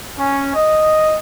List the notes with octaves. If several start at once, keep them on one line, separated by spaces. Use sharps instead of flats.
C#4
D#5